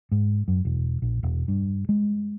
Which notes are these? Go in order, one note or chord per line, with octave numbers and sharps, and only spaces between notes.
G#2
F#2
E1
A#1
E1
G2
G#3